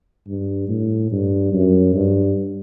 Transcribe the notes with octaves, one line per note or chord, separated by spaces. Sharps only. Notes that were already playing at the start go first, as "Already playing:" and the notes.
G2
A2
G2
F#2
G2